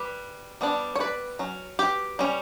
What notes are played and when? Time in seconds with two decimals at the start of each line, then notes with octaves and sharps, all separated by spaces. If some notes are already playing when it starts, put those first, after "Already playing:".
Already playing: G3 B4
0.61 G3 B3 D4
0.95 C#5
1.00 B4 D5
1.39 F#3 C#4
1.79 G4 B4
2.19 G3 C#4